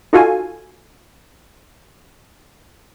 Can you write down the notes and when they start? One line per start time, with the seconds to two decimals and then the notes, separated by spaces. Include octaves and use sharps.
0.13 D#4 F4 F#4 A4 F5 G#5